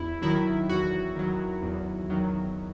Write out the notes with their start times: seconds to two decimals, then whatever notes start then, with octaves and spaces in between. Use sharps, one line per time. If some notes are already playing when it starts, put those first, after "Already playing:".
Already playing: E2 E4
0.22 D#3 F#3 E4
0.69 E2 F#4
1.16 D#3 F#3
1.62 E2
2.10 D#3 F#3